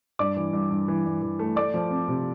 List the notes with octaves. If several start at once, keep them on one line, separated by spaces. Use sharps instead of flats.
G2 D5 D6
E3
G2
G2
E3
G2
E3
A3
A3 D5 D6
F3
C4
C3